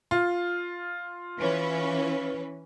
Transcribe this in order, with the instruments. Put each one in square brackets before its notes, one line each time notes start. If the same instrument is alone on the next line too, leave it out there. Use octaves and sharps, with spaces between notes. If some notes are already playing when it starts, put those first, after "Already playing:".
[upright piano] F4
[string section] E3 C#4 B4